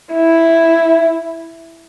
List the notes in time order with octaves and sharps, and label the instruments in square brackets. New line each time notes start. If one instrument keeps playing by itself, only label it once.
[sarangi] E4